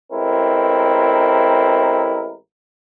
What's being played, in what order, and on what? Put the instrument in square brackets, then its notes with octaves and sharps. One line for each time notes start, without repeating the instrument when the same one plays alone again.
[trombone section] A1 G#3 C4 E4 A#4